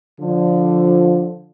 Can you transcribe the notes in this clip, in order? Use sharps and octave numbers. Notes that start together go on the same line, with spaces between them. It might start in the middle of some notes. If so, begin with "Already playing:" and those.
D3 F3